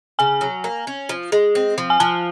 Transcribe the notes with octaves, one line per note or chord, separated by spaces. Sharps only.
C#3 G#5
F#3
A#3
C#4
F3
G#3
C4
F3
G#5
F3 A5